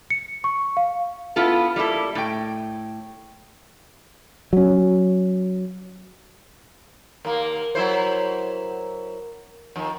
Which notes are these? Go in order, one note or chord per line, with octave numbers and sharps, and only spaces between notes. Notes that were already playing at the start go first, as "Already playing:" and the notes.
C#7
C#6
F5
B3 E4 F4 A4
G3 A#3 E4 A4
A2 G5
F#3 C#4
D#2 A#3 A#4
F#3 E4 C5
F2 D#3